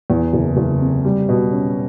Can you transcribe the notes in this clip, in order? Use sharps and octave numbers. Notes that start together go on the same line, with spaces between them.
E2
F#1
F#1
C3
G3
B2
C#4